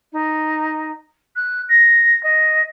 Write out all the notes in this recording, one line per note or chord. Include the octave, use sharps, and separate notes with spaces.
D#4
F#6
A#6
D#5